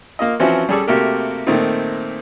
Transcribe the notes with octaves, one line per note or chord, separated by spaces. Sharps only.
A#3 F4 D#5
E3 F3 C4 C#4 E4 F#4
G3 C#4 G#4 A4 D5
C3 A3 A#3 F#4 G4 A#4
A#2 D#3 A3 C4 D#4